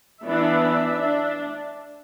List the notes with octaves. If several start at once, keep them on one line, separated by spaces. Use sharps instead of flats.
E3 B3 D4 E5
D4